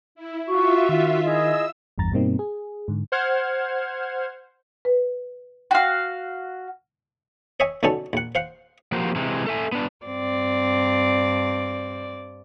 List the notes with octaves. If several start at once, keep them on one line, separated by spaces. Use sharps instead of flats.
E4
F4 F#4 E5 C#6
D#3
E4 G#4 D#5 E6
G#1 E2 G2 A#5 A6
G2 B2 G3 A#3 C4 D#4
G#4
G#2 D3
C5 F#5 F6 G#6
B4
F#4 F5 G5
C#5 D#5 E5 G#5
B1 B2 D3 C#4 A4 A5
A#1 F#5
C5 F5 F#5
F3 A#3 F#4 G4 C5
C3 E3 G#3
A4 E5 G#5
B3 D4
G2 C4 D5